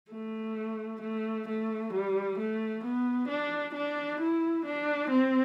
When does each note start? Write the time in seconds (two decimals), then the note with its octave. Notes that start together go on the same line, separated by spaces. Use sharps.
0.11 A3
1.01 A3
1.48 A3
1.93 G3
2.38 A3
2.83 B3
3.28 D4
3.74 D4
4.20 E4
4.65 D4
5.10 C4